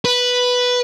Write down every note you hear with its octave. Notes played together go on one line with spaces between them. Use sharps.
B4